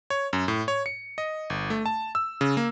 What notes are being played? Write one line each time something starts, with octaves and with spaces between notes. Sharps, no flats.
C#5
F#2
A2
C#5
C#7
D#5
G1
A3
A5
E6
C#3
A#3